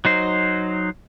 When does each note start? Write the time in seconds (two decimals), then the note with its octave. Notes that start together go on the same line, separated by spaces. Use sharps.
0.05 F#3 D#4 C5